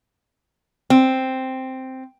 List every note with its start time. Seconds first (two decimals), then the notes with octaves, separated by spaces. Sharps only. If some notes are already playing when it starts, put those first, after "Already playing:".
0.90 C4